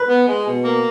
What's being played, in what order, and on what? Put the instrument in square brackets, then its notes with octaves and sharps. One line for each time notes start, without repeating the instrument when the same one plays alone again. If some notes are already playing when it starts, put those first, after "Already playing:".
Already playing: [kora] B4
[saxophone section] B3
G#3
B2
A#3